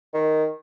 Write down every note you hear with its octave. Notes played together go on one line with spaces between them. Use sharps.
D#3